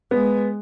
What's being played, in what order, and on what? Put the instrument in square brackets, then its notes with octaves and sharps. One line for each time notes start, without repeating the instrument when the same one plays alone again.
[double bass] G#3 [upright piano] B3